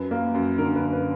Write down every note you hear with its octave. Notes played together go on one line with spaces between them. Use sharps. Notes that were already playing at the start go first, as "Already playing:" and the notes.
Already playing: F#2 B4
A#3
F#2
D3 A#4
F#2 B4
B4